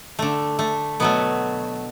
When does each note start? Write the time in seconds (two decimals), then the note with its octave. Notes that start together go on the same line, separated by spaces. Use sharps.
0.19 D3 A3
0.59 A3
1.00 B2 F#3 A3 B3